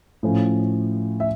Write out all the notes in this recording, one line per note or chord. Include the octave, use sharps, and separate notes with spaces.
A2 F3 A3 C#4
E5